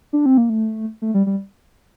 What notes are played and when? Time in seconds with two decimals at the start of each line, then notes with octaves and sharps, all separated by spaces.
0.13 D4
0.26 C4
0.38 A#3
0.49 A3
1.02 A3
1.14 G3
1.27 G3